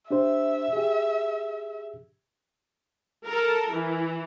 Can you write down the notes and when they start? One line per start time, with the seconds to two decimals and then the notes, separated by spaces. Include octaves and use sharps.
0.11 D4 G4 C5 E5
0.73 G4 G#4
3.26 A4 A#4
3.73 E3